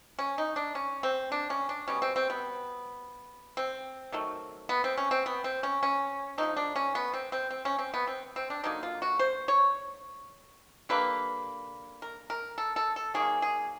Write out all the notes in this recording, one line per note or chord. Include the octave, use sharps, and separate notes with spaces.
C#4
D#4
D4
C#4
C4
D4
C#4
D4
B2 G3 B3 C#4
C4
C4
B3
C4
D#3 F#3 A3
B3
C4
C#4
C4
B3
C4
C#4
C#4
D3 F3 A3 D#4
D4
C#4
B3
C4
C4
C4
C#4
C4
B3
C4
C4
D4
D3 F#3 A#3 D#4
F4
F#4
C5
C#5
D3 G3 A#3 B4
A#4
A#4
A4
A4
A4
D#3 F#3 A#3 G#4
G#4